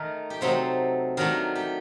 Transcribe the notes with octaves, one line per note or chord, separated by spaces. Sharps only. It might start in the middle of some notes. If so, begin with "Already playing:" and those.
Already playing: D#3 A3 D#4 A#4
G4
C3 F#3 A3 C4 D#4 A4
D#3 F#3 A3 D4 A#4
G4